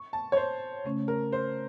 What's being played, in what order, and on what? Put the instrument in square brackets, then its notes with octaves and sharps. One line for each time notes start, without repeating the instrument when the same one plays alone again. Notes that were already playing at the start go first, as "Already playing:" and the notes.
Already playing: [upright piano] C#6
A5
C#5
C5
[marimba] C#3 A3 C#4
[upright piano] A#4
C5